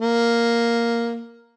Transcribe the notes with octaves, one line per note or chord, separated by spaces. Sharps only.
A#3